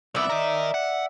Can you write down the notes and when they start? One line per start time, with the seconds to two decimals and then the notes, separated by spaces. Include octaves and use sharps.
0.15 C2 B3 D5 E5
0.30 A#4 D#5
0.74 F#5